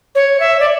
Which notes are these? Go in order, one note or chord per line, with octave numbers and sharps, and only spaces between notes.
C#5
E5
D5